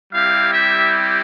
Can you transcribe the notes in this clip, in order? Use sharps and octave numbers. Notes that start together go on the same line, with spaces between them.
G3 C4 E4 G4 F5
E5